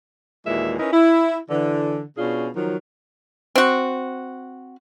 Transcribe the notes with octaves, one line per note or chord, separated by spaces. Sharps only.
D#2 A#2 E3 G#3 E5
C#4 D#4 E4 A#4 B4
E4
D3 E3
B2 C#4 D4 F4 G#4
D#3 F3 F#3
C4 F#4